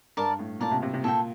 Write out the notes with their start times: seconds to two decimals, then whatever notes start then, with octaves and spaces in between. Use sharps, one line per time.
0.17 G2 A#4 D5 A5
0.39 A2
0.60 A#2 A#4 D5 A5
0.71 C3
0.82 C3
0.94 C3
1.04 A#2 A4 E5 G5